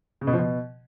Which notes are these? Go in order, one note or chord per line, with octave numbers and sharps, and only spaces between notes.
C#3
B2
F3
B2